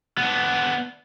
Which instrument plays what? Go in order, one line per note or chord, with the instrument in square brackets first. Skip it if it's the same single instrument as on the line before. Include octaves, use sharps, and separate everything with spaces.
[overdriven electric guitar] B3 D4